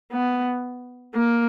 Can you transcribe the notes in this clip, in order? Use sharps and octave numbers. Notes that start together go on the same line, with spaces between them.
B3
A#3